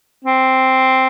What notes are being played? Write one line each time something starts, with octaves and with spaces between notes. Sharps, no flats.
C4